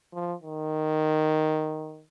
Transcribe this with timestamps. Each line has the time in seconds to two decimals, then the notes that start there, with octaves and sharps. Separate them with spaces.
0.14 F3
0.42 D#3